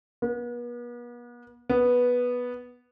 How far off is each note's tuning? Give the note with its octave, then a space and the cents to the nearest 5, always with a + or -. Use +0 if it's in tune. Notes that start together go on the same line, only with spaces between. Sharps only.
B3 -40
B3 -5